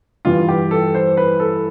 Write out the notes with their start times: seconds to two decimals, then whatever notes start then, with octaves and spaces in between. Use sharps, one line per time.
0.25 G2 E3 G3 F4
0.48 G4
0.71 A4
0.95 C5
1.17 B4
1.40 A4